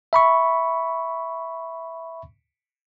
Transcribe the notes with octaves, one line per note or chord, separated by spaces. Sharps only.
E5 B5 C#6